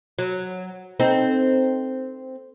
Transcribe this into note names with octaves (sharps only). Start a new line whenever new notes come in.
F#3
C4 D#4 A4